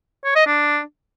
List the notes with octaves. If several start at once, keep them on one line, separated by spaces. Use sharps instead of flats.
C#5
D#5
D4